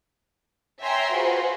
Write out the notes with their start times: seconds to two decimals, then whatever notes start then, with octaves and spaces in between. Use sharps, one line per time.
0.82 C#5 E5 G5 G#5 A#5 C6
1.13 F4 F#4 G#4 B4 C5